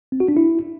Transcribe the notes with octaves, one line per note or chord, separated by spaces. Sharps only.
C4
F#4
D4
E4